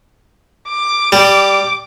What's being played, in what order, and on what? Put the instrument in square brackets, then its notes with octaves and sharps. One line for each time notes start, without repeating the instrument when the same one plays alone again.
[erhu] D6
[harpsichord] G3